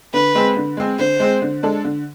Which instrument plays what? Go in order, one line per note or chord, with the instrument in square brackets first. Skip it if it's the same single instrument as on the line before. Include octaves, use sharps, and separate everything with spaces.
[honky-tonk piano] D3 [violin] B4
[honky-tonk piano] G#3 C4 G#4
D3
G#3 C4 G#4
[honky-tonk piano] D3 [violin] C5
[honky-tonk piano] G#3 C4 G#4
D3
G#3 D4 A4
D3